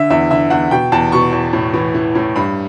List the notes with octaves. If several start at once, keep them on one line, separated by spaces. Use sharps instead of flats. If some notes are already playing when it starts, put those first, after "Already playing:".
Already playing: D3 E5
E2 E5
D3 E5
E2 F#5
B2 G5
E2 A5
B2 C#6
E2
A2
E3
E3
A2
G2 B5